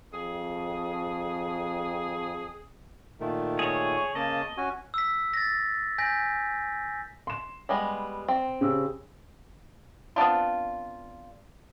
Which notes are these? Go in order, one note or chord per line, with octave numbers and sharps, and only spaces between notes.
F2 G#4
A#2 D#3 A3
G#4 C#5
C#3 A#3 D#5 A5
C#4 F#4 G#5
E6 B6
A6 A#6
G#5 G6 A#6 B6
C6 E7
G3 G#3 B3
C4
C#3 G4 E6
B3 C4 D4 F4